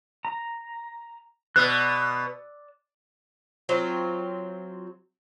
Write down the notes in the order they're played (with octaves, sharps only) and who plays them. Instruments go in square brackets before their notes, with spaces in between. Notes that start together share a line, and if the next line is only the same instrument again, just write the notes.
[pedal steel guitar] A#5
[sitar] B2 B3 [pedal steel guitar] D5 E6 F#6
[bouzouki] F#3 C4 F4